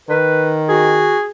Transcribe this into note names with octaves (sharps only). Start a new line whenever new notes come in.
D#3 B4
F#4 G#4